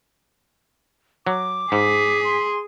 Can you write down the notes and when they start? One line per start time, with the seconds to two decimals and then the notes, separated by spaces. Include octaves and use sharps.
1.27 F#3 D6
1.72 G#2 G#4 B6
2.24 C6